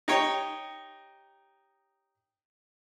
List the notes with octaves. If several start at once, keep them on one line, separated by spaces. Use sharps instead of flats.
D#4 G4 C#5